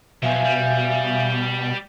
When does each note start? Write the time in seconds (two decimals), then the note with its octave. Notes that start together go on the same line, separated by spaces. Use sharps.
0.23 B2 F3 F#3 E5 F5 G#5
0.44 G3